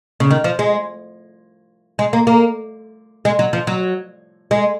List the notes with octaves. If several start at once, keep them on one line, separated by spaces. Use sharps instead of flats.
C#3
D#3
F3
G#3
G#3
A#3
A#3
G#3
F#3
F3
F#3
G#3